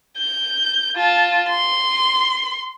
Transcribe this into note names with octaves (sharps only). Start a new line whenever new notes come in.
G6
F4 A5
C6